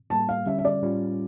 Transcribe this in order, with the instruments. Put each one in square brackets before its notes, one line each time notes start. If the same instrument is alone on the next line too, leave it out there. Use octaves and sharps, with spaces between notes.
[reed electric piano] A2 G3 A#3 [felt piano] A5
[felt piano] F5
[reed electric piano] D3 G3 C#4 [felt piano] E5
[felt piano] E5
D5
[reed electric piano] A2 G3 C#4 F4